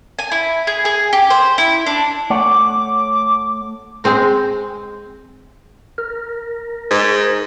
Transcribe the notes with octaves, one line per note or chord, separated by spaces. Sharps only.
G#5
E4
G#4
G#4
G4
C5
E4
D4
A3 C#5 F#5 D6
G#3 C4 A#5
A#4
G#2